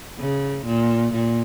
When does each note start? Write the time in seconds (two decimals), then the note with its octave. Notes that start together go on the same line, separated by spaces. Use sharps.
0.19 C#3
0.65 A#2
1.13 A#2